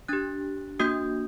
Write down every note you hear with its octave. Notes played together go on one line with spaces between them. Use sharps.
D4 G4 F#6 A6
A#3 D4 F#4 D#6 G6